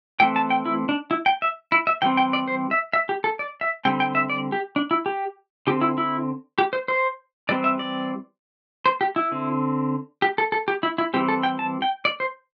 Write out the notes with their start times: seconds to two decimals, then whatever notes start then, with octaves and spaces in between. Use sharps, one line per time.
0.20 E3 A3 C4 G5
0.36 A5
0.50 G5
0.65 E4
0.89 D4
1.11 E4
1.26 G5
1.42 E5
1.72 E4
1.87 E5
2.02 E3 G3 C4 G5
2.17 G5
2.33 D5
2.48 C5
2.71 E5
2.93 E5
3.09 G4
3.24 A4
3.39 D5
3.61 E5
3.85 D3 G3 C4 G5
4.00 G5
4.15 E5
4.30 D5
4.52 G4
4.76 D4
4.91 E4
5.06 G4
5.67 D3 C4 G4
5.81 E4
5.98 E4
6.58 G4
6.73 C5
6.88 C5
7.49 E3 G3 C4 D5
7.64 E5
7.79 D5
8.86 C5
9.01 G4
9.16 E4
9.32 D3 C4
10.22 G4
10.38 A4
10.52 A4
10.68 G4
10.83 E4
10.98 E4
11.14 E3 G3 C4 G4
11.28 A4
11.43 G5
11.59 A5
11.82 G5
12.05 D5
12.20 C5